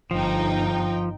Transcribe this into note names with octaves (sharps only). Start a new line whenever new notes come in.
G1 F3 D#4 G5